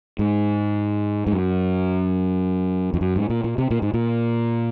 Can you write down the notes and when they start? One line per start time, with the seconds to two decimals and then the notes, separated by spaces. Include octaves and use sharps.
0.19 G#2
1.27 G#2
1.32 F#2
2.94 F2
3.01 F#2
3.16 G#2
3.30 A#2
3.44 A#2
3.58 C3
3.71 A#2
3.82 G#2
3.94 A#2